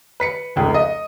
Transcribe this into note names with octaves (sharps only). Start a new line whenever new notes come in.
B4 B6 C#7
F1 C#2 G#4
D#5